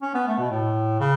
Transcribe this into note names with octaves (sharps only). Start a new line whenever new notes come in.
C#4
B3
A3
B2
A2
C#3